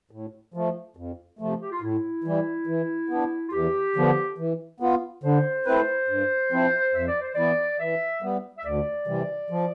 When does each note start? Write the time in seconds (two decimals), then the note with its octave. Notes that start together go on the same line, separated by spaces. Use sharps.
0.11 A2
0.54 F3 A3
0.97 F2
1.39 C3 F3 A3
1.62 G4
1.72 F4
1.82 A2 E4
2.24 E3 G3
2.67 E3
3.09 B3 D4
3.48 F4
3.52 E2 G4
3.96 D3 F3 B3
4.38 E3
4.80 B3 F4
5.23 D3 C5
5.66 A3 C4 E4 B4
6.08 G2
6.52 F3 C4 E4
6.94 F2 E5
7.07 D5
7.21 C5
7.35 E3 B3 E4 D5
7.80 E3 E5
8.22 G3 B3
8.58 E5
8.65 D2 D5
9.07 C3 E3 G3
9.50 F3